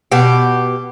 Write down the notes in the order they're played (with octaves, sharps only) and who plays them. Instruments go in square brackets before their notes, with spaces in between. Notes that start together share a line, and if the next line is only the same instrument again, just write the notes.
[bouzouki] B2 G4